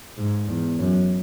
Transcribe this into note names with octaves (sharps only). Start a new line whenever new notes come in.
G#2
E2
F#2